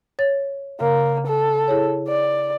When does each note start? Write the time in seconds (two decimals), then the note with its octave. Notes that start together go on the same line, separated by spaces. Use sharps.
0.19 C#5 A6
0.81 C#3 A#3
1.27 A4
1.68 E4 G#4 C#5
2.08 D5